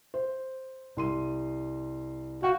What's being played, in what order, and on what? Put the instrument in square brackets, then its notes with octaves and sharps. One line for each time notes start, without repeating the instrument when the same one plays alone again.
[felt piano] C5
C2 C6 D#7
[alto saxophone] F#4 [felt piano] F5 G5